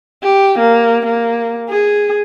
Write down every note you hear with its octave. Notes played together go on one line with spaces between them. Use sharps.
G4
A#3
A#3
G#4